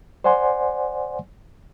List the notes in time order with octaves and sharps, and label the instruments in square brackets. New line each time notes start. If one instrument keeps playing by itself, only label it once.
[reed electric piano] C5 D5 F#5 G#5 C6